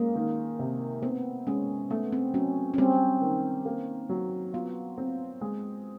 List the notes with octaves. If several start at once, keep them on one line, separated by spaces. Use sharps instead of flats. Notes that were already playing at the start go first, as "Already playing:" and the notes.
Already playing: G#3 A#3 C#4
D#3
C3
B3 C4
G#3 C#4
A3 B3
C4
F#3 C#4
C#4
G3 C4
D#3
A#3
F#3
B3 F4
C4
G#3